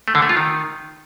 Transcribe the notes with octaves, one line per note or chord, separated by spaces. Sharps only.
A3
D3
A3
F4
D#3